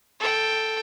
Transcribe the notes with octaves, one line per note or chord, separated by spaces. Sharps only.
A4 G5